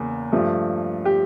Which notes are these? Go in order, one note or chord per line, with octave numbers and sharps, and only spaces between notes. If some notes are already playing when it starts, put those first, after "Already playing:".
Already playing: E2 C#3 A#3
G2 F3 A3
G4